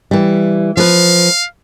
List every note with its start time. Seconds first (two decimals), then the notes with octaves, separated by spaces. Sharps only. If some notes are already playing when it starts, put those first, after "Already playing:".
0.11 E3 G3
0.77 F3 B4 F5